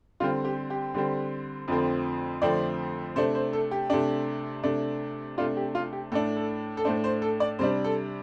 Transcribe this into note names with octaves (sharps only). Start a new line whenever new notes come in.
D3 G3 C4 F4
G4
G4
D3 G3 C4
F2 D3 F3 A3 C4
F2 D3 F3 A3 C4 D5
C3 A3 D4 C5
C5
A4
G4
C3 A3 D4
C3 A3 D4
C3 A3 D4 F4
G4
F4
G4
A2 A3 D4 A4
A4
A4
A2 A3 D4 C5
C5
A4
D5
C3 G3 D4 C5
A4